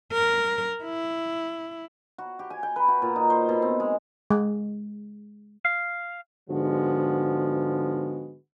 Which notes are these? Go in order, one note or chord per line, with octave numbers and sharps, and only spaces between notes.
A#4
E4
F#4
G4
G#5
G5
B4
F#4
A#2
D#4
C5
B2
C4
G#3
G#3
F5
G#2 D3 F3 G#3 B3 F#4